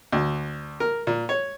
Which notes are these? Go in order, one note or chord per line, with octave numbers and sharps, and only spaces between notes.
D2
A#4
A#2
C#5